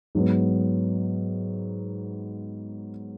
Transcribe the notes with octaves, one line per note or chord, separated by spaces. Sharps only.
G#2 F#3 B3